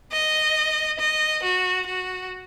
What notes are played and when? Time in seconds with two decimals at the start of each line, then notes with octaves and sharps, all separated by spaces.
0.12 D#5
1.00 D#5
1.43 F#4
1.86 F#4